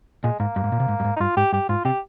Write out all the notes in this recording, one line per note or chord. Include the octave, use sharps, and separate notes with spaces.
A#2 G#3
G#2 A#3
G2
G#2
A#2
C3
G#2
G2
G#2
D#4
G2 F4
G#2 G4
G2 G4
G#2 F4
C3 G4